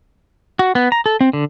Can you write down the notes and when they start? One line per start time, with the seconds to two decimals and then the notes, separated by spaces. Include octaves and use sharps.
0.59 F#4
0.75 B3
0.92 A#5
1.06 A4
1.21 C4
1.33 D3